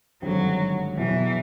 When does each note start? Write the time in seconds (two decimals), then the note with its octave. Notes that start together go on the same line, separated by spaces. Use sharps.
0.22 G#1 G2 D3 F#3
0.97 E1 E2 B2 E3 F#3